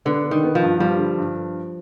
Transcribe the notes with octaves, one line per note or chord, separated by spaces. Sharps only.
D3 B3
B3
D#3
B3
F3
G2
F3 G3
D3
G2